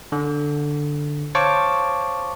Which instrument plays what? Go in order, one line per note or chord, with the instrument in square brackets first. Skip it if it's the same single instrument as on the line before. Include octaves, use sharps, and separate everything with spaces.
[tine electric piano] D3
C5 C#5 F5 A5 C#6 D6